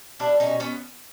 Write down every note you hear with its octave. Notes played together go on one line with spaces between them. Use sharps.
G3 D4 E4
C#4 D#4
B2
B3 C#4